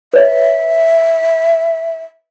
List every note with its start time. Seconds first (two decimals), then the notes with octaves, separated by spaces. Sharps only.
0.14 B4 C#5 D#5 E5